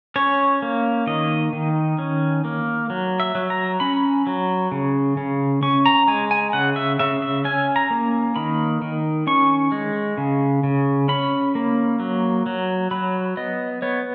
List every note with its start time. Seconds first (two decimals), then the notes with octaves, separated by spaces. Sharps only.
0.16 C#4 C#5
0.62 A#3
1.07 D#3 D#5
1.53 D#3
1.99 C#4
2.45 A#3
2.90 F#3
3.20 E5
3.35 F#3
3.50 A#5
3.80 C#4 B5
4.27 F#3
4.72 C#3
5.17 C#3
5.63 C#4 C#6
5.86 A#5
6.08 G#3 G#5
6.31 G#5
6.53 C#3 F#5
6.76 E5
6.99 C#3 E5
7.22 E5
7.45 C#4 G#5
7.76 A#5
7.90 A#3
8.36 D#3 B5
8.82 D#3
9.27 C#4 C#6
9.72 G#3
10.18 C#3
10.63 C#3
11.08 C#4 B5
11.55 A#3
12.00 F#3
12.46 F#3
12.91 F#3 B5
13.37 B3 D#5
13.82 B3 C#5